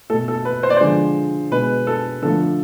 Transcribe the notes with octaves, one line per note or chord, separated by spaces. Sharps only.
B2 A3 A4
A4
B4
C5
D5
D3 F3 G#3 C5
B2 G#3 B4
A4
D3 F3 A3 A4